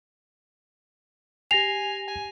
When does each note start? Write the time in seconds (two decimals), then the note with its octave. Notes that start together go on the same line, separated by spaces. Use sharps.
1.51 G4 G#5 A#6 C7 F7
2.08 G#5